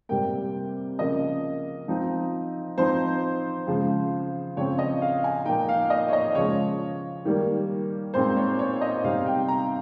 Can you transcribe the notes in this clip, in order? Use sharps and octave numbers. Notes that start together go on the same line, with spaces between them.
C3 G3 A#3 G5
C#3 F3 A#3 C#4 D#5
F3 C4 D#4
F3 C4 D#4 C5
C#3 F3 G#3
C#3 F3 C4 C#5
D#5
F5
G#5
A#2 F3 A#3 D#4 G5
F5
D#5
C#5
D#5
C#3 F3 G#3 C#5
D#3 G3 A#3
A#2 G#3 C4 D#4 C5
C#5
C#5
D#5
C3 G3 C4 D#4 F5
G5
A#5